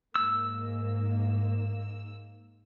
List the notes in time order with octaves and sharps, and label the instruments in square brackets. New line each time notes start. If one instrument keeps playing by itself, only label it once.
[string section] G#2 A#3 [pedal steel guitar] E6